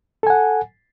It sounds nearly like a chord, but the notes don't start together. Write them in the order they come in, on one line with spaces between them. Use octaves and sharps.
A4 G#5 F#5